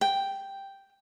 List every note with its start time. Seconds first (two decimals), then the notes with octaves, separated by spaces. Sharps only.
0.01 G5